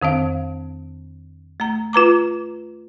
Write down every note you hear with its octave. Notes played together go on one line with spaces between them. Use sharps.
F2 D#3 C4 F5
A3 A#5
F4 B4 A#5 D6